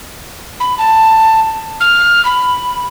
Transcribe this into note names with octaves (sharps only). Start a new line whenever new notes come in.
B5
A5
F6
B5